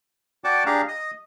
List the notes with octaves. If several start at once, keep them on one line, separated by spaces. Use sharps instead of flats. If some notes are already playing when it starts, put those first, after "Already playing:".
F#4 D5 F#5 G5 A5 D6
D4 G4 G#4 F5 A#5
D#5 D#6